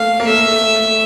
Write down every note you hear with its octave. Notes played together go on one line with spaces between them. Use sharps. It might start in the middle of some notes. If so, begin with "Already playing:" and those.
Already playing: A3 A#3 F5
A#3
A3 E5
A3
A3